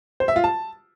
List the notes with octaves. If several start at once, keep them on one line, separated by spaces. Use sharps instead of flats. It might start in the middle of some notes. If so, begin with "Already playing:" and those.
C5
E5
F4
A5